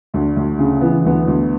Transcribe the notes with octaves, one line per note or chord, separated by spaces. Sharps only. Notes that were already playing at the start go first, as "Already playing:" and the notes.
D2 D4
D2
C#3
E3 B3
D2 B3
D2